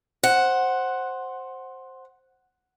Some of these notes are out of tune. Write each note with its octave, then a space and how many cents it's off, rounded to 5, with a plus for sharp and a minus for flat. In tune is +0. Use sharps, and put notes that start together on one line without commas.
C5 +10 F#5 +0